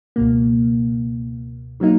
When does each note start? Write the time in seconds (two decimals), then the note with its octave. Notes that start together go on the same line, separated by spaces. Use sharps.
0.16 C#2 B2 A#3
1.80 D#3 F#3 A#3 D#4